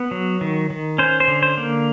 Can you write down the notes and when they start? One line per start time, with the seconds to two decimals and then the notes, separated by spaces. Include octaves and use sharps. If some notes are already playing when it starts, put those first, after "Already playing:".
Already playing: B3
0.11 F#3
0.41 D#3
0.70 D#3
0.98 C#4 C5
1.20 C5
1.28 D3
1.43 C5
1.57 A#3